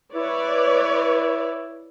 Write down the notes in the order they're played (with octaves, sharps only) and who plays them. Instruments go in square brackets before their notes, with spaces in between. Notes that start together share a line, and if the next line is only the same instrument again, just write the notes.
[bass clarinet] E4 [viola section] B4 C#5 D5